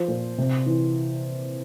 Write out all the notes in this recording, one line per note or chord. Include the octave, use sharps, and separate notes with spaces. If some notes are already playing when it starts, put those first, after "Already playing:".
Already playing: F3 C5
A#2
C3
E3